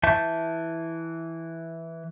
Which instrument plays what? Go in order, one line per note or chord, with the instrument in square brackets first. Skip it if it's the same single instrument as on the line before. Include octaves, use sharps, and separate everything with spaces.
[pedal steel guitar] E3 E5 A5 G6